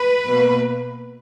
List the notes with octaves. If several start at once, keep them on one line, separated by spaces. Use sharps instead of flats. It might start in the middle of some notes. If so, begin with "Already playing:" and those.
Already playing: B4
B2 A#3